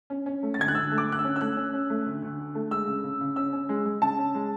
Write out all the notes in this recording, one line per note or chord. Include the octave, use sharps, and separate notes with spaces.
C#4
C#4
A3
A6
D2 G#6
F#6
D2 E6
A3
D6
D2 F#6
E6
C#4
E6
A3 F#6
C#4
C#4
A3
D2
D2
D3
A3
G#3 E6
C#3
C#3
C#3
C#4 E6
C#4
G#3
G#3
C#3 A5
C#4
G#3